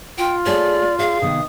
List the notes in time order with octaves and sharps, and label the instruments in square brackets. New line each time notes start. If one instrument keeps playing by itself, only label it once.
[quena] F4 [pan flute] G5
[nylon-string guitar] A3 G#4 C#5 [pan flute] D5
[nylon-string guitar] G#4 D5 F#5 [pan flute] F5
[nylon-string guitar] C3 D#3 B3 [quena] D#6